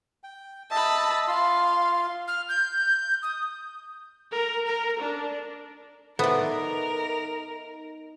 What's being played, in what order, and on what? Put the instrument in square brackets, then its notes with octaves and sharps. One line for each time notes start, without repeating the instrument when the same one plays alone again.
[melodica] G5
[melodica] D#5 E5 [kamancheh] A5 B5
[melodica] F4 C6 [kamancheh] F5
[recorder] F6
G6
D#6
[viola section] A#4
A#4
D4
[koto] B3 D5 [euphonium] D#4 [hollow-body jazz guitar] A4 C5 E5 [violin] A#4